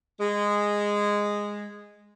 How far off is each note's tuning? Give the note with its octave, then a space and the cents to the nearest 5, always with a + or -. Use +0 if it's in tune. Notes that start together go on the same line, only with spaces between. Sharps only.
G#3 -10